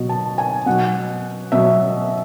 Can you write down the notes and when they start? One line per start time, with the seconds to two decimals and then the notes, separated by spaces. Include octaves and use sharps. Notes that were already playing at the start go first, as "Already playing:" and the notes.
Already playing: B2 F#3
0.09 A5
0.38 G#5
0.66 B2 F#3 F#5
1.52 B2 F#3 E5